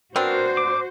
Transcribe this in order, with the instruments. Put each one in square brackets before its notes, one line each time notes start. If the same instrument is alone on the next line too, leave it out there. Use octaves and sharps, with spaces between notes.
[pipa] B3 C4 D4 [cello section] F#4 C5 [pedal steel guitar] A#4
[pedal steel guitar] D6